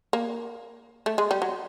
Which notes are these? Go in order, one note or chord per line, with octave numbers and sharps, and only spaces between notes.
A#3
A3
G#3
G3
F#3